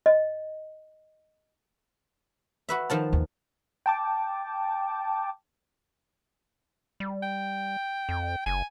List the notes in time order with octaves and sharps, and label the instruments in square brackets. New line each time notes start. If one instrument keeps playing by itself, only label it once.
[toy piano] D#5
[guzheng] F#4 B4 E5
D#3 F3 A5
[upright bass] D#2
[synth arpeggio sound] G5 A5 D6
[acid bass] G3
[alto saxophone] G5
[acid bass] F2
[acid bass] F#1 [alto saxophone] G#5